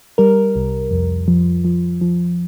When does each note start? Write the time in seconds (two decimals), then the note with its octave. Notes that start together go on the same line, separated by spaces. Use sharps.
0.18 G3 A#4
0.56 C2
0.91 F2
1.28 F3
1.64 F3
2.01 F3